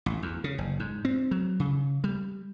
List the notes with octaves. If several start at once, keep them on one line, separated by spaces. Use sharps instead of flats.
A1
E2
C#3
F#1
G#2
C4
F#3
C#3
G3